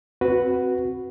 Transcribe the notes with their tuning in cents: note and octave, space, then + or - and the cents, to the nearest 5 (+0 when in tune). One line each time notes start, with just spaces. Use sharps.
C4 +0 F#4 +0 B4 +0